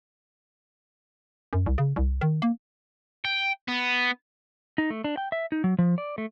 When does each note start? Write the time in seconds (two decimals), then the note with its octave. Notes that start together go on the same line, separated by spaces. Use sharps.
1.53 F#2
1.66 C2
1.78 C#3
1.96 C2
2.21 D#3
2.42 A#3
3.25 G5
3.68 B3
4.78 D#4
4.90 A3
5.04 D4
5.17 G5
5.32 E5
5.52 D#4
5.64 F#3
5.79 F3
5.98 D5
6.18 A3